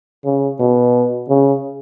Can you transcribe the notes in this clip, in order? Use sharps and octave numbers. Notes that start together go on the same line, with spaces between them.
C#3
B2
C#3